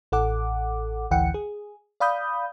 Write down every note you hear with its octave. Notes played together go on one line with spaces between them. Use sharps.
A1 A4 F#5 D6
A1 D2 E3 F#5 G5 C#7
G#4
D5 F5 B5 D#6 G6